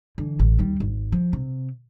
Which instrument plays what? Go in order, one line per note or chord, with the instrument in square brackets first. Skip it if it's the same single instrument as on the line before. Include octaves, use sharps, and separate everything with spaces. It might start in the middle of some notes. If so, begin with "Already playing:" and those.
[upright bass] D3 E3
A1
D#2 G3
G#1
F3
C3